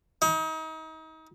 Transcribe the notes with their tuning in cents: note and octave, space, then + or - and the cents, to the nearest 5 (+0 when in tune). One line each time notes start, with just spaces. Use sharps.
D#4 +35